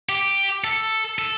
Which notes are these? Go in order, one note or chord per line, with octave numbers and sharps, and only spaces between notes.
G4
A4
A4